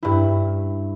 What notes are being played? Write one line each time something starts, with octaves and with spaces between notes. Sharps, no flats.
G2 E4